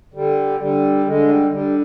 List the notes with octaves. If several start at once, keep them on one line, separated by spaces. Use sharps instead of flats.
D3 G3
D3 G3
D3 G#3
G3
D3 G3